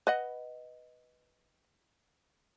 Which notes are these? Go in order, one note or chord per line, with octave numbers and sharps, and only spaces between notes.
B4 D#5 F#5